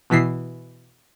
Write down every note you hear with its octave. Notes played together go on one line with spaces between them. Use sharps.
B2 E3 B6 C7